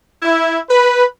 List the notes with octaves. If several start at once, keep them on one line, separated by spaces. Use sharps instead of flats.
E4
B4